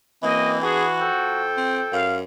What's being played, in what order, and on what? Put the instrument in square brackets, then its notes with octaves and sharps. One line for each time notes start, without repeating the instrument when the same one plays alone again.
[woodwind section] F#2 A#3 C4 [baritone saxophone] E3 [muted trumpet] D#5
[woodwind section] B3 D4 G#4 [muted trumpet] F#4
[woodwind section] F2 A4 G5
[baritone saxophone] C4
[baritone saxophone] F#2 [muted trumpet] F5